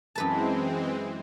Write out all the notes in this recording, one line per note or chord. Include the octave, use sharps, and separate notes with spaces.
F#2 E3 G#3 C4 B4 A5